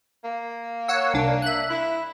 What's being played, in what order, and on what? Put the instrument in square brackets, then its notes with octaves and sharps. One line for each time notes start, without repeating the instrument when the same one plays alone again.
[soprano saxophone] A#3
[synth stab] C#5 F#5 E6
C2 D4
E5 F#6
[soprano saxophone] E4